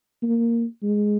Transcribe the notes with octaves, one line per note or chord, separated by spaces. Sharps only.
A#3
G#3